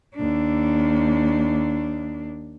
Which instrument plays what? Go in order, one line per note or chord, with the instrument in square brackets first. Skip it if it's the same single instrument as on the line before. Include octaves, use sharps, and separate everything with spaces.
[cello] D#2 D4